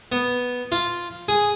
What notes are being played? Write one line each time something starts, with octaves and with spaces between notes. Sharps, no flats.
B3
F4
G#4